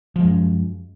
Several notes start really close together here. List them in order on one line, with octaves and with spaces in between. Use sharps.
F3 G#3 F#2